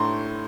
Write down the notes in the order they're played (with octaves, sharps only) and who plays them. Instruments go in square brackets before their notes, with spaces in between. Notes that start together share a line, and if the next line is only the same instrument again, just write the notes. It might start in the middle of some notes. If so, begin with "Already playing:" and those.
Already playing: [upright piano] A2 A3 D4 A#5 C6